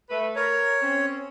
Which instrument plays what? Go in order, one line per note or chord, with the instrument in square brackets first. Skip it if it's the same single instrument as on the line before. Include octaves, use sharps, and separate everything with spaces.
[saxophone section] A3 B4
[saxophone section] A#4 [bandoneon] C#5
[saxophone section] C4 C#4